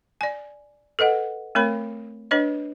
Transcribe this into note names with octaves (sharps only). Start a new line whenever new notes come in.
D5 G#5
A4 B4 D#5 F#5
A3 C4 A#4 C#5 B5
D4 B4 C#5 D#5